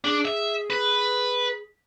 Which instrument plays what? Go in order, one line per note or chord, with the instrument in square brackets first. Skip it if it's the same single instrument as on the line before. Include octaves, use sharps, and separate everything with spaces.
[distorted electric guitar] D4 [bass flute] G#4
[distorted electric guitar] E5
B4